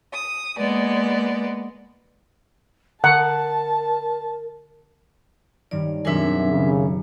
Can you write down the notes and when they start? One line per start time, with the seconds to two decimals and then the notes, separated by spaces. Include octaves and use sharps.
0.13 D#6
0.57 G#3 A#3 B3 D5
3.04 D3 A#4 F#5 A5
5.71 G2 D#3 C#4 D5
6.05 D#1 F#2 B2 C4 D4 G#4 A#4 E5
6.50 C#3 C#4